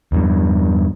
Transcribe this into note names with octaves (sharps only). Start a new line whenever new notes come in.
E2 G2